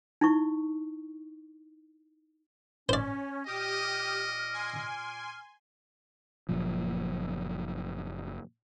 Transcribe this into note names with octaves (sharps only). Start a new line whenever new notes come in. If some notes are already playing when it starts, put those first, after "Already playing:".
D#4 E4 C#6
C#4 C5 D5
A#2 G4 D#5 D6 D#6 F6
G#5 C6
F#1 F#2 A#2 F3